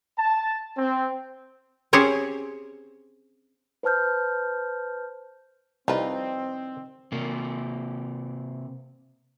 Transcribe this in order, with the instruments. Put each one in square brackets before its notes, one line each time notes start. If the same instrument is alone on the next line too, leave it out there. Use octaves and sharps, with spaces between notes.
[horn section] A5
C4
[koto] C4 C#4 G4 G#4 C5 C#5
[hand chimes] B4 C5 A5 F6 G6
[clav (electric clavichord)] C2 [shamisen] F3 B4 [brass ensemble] C4 [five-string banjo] D#4 D5
[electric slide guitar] C3 A#3